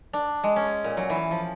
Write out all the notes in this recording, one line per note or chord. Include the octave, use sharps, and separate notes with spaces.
D4
G#3
C#4
A#2
F#3
E3
F3